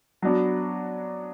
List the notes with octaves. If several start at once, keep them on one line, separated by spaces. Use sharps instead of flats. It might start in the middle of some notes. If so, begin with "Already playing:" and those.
F#3 B3 D4 F#4